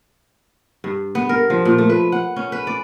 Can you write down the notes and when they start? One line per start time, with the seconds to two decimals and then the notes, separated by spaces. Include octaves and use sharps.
0.84 G2
1.15 B3
1.29 A#4
1.50 F3
1.65 A#2
1.78 A3
1.89 B4
2.12 F#5
2.36 C#4
2.52 B4
2.67 D5